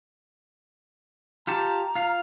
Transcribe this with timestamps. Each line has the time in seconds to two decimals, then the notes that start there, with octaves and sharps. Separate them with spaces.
1.47 F4 G4 A5 A#5
1.95 F4 F5